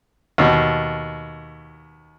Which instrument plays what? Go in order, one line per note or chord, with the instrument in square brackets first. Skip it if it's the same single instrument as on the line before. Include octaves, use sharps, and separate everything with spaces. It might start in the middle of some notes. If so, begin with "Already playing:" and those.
[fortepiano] D#2 B2